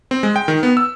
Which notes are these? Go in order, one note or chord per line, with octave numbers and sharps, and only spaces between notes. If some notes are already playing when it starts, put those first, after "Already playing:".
C4
G#3
G5
D#3
B3
E6